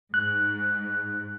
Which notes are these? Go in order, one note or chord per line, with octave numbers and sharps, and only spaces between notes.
G#2 F#6